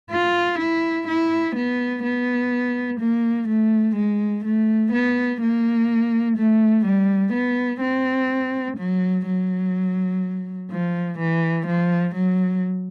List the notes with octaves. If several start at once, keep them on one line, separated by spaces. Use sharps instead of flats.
F4
E4
E4
B3
B3
A#3
A3
G#3
A3
B3
A#3
A3
G3
B3
C4
F#3
F#3
F3
E3
F3
F#3